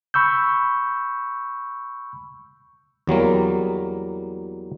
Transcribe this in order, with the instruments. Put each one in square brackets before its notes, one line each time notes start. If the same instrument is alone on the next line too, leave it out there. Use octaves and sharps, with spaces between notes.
[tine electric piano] B5 C#6 E6 G6
[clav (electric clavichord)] E2 F#3 G3 A#3